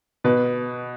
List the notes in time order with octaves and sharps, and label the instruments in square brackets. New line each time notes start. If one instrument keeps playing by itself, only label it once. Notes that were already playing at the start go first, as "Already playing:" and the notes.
[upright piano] B2 B4